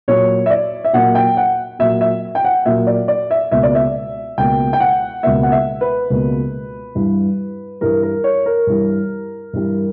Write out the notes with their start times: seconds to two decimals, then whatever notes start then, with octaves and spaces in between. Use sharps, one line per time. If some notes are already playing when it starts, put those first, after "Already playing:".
0.08 A#2 F#3 A#3 C#5
0.46 E5
0.50 D5
0.84 E5
0.93 A#2 F#3 A#3 F#5
1.15 G5
1.37 F#5
1.79 A#2 F#3 A#3 E5
2.01 E5
2.35 G5
2.45 F#5
2.66 A#2 F#3 A#3 E5
2.87 D5
3.08 D5
3.31 E5
3.51 C#2 B2 A#3 E5
3.63 D5
3.75 E5
4.38 C#2 B2 A#3 G5
4.73 G5
4.80 F#5
5.23 C#2 B2 A#3 E5
5.43 F#5
5.52 E5
5.81 B4
6.10 C#2 B2 A#3
6.95 G2 E3 G3
7.81 G2 E3 G3 A#4
8.03 A#4
8.24 C#5
8.46 A#4
8.67 G2 E3 G3
9.53 G2 E3 G3